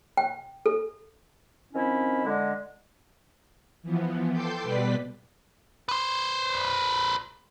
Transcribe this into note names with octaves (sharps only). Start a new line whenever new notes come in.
G5
A4
D#3 F3 C4 C#4 E4
D3 G#3
E3 F3 B3
A4 G5 C6 D6 G6
B2 G3 B4 D5 B6
B4 C5